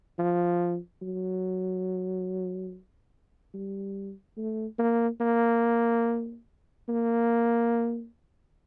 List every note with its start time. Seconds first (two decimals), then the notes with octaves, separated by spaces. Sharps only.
0.19 F3
1.02 F#3
3.54 G3
4.37 A3
4.79 A#3
5.21 A#3
6.89 A#3